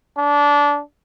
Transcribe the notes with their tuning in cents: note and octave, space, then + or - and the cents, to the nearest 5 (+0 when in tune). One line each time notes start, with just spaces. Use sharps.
D4 -20